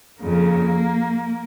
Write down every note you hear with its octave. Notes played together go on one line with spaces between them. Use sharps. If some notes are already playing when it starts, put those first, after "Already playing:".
F2 C#3 A#3